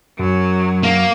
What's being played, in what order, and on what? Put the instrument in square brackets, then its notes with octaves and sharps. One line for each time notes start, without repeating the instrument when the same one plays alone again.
[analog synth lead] F#2 [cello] F#3
[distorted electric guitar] A#3